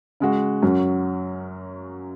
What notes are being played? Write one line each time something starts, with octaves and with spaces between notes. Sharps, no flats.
C#3 G#3 F#4
F#2 F#3 C#4